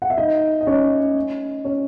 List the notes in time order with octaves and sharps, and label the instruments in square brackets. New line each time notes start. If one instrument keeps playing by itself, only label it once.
[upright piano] F#5
E5
D#4 D#5
D#5
C#4 C#5
C#4 C#5